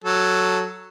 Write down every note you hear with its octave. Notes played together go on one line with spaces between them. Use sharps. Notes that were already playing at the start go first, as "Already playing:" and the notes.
F#3 A4